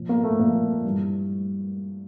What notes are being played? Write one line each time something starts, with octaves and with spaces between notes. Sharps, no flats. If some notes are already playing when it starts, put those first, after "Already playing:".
Already playing: A#2 F3
A#3
A3
A#2 F3 A#3
G2 E3